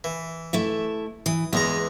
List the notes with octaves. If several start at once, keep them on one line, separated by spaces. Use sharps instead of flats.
E3
A3 E4 E5
E3 D#6
E2 G#3 B3 A#5